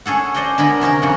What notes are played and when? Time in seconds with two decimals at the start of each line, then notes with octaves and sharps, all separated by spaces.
0.06 C#4 G#4 A4 F#5
0.34 C5 D5 D#5 F#5 G5
0.58 D3 G#3 B3 A#4 G#5 B5
0.81 C3 C#4 D#4 A#4
1.02 F2 C#3 F#5